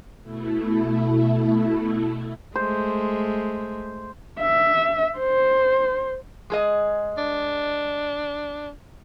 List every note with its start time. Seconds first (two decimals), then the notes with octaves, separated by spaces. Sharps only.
0.22 B2 A3 E4
2.56 G#3 A3 C5
4.40 E5
5.19 C5
6.50 G#3 G#4 D#5
7.18 D4